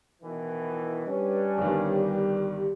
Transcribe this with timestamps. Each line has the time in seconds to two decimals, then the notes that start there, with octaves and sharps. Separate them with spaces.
0.22 B2 D#3 E3
1.06 G3 C#4 D4 B4
1.58 G1 G2 D#3 G4